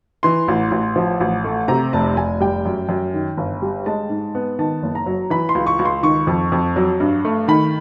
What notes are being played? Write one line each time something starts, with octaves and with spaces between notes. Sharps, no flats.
E3 C6
A1
A1
F3
A1
A3
C3 A#5
F1 A5
F1 G#5
G3 G5
F#2
F#2
D#3
G1
G3
G#3 A5
G#2
B3
D#3 A5
F#1
A#5
F#3
E3 B5
C6
C#2
C#6
C#2
C6
D#3 C#6
F2
F2
F#3
G2
A3
D#3 B5